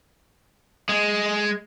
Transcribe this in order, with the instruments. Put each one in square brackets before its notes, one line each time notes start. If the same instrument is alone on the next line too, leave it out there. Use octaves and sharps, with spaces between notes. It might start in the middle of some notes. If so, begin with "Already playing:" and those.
[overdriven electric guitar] G#3